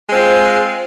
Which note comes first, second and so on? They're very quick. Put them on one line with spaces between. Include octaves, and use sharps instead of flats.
G#3 C4 F4